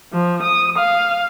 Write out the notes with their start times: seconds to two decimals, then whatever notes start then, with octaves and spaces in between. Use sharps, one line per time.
0.12 F3
0.42 D#6
0.78 F5